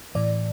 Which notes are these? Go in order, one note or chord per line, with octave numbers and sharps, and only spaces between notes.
A2 E3 D5